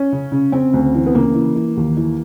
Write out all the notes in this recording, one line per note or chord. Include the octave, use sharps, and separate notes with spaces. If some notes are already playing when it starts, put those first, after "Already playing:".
Already playing: C#4
C#3
C#3
C#3 C4
D2
E3
B3
C#3 A#3
E3
E3
D#2
E3